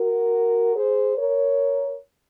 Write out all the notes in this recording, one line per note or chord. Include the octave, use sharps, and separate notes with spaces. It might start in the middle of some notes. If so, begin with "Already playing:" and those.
Already playing: F#4 A#4
G#4 C5
A#4 C#5